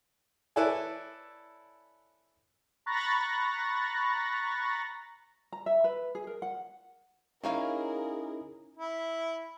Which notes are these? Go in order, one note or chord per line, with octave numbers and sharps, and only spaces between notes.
E4 A4 B4 C#5 D5 G#5
A#5 B5 C#6 F#6 A6 A#6
A#5
E5
B4
G#4
A#4
F#5
A#3 C#4 D#4 E4 G#4 A#4 C#5 F5
E4